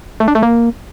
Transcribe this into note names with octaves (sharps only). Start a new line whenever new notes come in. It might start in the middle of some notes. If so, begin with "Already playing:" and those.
A3
D4
A3
A#3